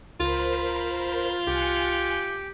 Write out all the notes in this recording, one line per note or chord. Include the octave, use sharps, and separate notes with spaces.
C#2 F4 A#4 C5 B5
C2 G4 G#5 F#6 C#7